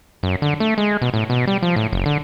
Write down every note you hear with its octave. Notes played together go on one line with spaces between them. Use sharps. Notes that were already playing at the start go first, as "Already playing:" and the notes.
F#2
D3
A3
G#3
B2
A2
B2
G3
F3
A2
F#1
D3